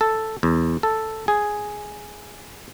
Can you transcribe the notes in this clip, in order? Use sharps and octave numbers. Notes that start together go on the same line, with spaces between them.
A4
E2
A4
G#4